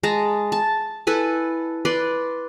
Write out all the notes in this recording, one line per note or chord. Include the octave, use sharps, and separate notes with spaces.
G#3 A5 A#5
A5
E4 A4 B4 G#5
B4 D5 C6